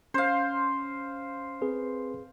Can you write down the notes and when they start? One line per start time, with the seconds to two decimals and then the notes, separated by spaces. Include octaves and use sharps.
0.14 C#4 C5 F5
1.62 C4 G#4 B4